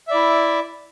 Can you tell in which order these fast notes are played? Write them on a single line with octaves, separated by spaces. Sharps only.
E5 D5 E4